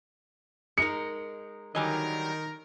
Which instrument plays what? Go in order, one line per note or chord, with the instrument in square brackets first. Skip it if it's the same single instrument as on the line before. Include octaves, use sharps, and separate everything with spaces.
[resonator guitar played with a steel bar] G#3 D#4 A#4 [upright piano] C#7
[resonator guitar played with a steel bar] D3 F#3 G3 [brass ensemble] D#3 A#4 [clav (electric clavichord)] D#5 G#5